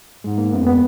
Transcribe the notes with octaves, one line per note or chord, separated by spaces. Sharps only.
G#2 G#3
A#3
F#2 B3
F2
B3